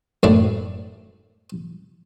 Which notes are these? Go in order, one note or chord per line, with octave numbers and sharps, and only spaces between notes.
F#2 A2 D4